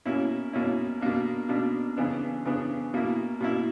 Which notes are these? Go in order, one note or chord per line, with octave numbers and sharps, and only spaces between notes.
B2 A#3 C#4 E4
B2 A#3 C#4 E4
B2 A#3 D4
B2 A#3 D4
C#3 E3 B3 D4
C#3 E3 B3 D4
B2 A#3 E4
B2 A#3 E4